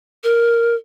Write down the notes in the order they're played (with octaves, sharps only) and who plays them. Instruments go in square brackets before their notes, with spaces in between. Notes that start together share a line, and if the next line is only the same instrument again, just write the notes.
[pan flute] A#4